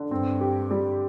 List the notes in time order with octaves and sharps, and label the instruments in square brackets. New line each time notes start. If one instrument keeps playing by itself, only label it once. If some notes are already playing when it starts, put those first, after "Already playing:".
Already playing: [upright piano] D3
[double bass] G2 [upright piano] C4
[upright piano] G4
G3